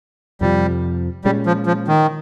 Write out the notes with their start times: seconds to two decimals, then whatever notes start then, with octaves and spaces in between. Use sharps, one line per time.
0.41 F2 C3 F3 G3
1.25 A#2 G3 G#3 C#4
1.46 F3
1.66 F3
1.88 D#3